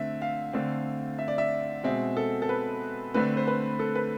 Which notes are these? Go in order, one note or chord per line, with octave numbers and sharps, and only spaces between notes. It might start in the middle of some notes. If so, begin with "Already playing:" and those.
Already playing: D3 A3 C4 E5
F5
D3 A3 C4
E5
D5
E5
B2 G#3 C4 E5
A4
A4
B4
D3 A3 C4 B4
C5
B4
A4
B4